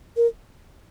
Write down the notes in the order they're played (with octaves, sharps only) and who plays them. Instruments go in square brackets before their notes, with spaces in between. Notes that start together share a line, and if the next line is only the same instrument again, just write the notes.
[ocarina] A#4